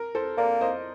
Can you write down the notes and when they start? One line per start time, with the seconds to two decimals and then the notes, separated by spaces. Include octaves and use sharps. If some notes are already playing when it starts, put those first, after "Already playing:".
Already playing: A#4
0.15 A4 C5
0.37 A#3 A#4 D5
0.61 C5 D#5